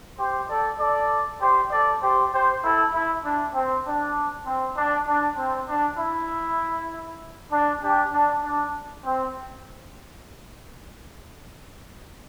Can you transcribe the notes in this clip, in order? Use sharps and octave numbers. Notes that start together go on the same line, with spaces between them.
G4 C5
A4 D5
A4 D5
G4 C5
A4 D5
G4 C5
G4 C5
E4 A4
E4
D4
C4
D4
C4
D4
D4
C4
D4
E4
D4
D4 G4
D4
D4
C4